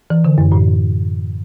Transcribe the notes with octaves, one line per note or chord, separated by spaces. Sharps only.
E3
D3
F#2
A2